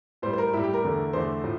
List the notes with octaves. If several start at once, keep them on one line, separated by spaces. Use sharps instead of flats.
A2 G3 C5
C5
A#4
A2 G3 E4
G4
A#4
E2 D3 A3
E2 D3 A3 C5
A2 F3